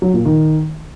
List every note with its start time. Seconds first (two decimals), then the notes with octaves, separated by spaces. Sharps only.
0.02 F#3
0.14 A#2
0.25 D#3